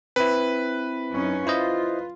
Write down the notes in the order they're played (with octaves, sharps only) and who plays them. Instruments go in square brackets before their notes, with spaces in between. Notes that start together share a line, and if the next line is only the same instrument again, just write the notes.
[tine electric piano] C4 E4 [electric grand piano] B4
[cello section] F#2 C#4 D#4
[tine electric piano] E4 C5 D#5 [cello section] F4